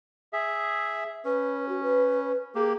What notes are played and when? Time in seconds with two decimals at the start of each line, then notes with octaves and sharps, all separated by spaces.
0.33 G#4 E5
1.25 C#4 B4
1.69 F#4
1.83 B4
2.55 A#3 G4 G#4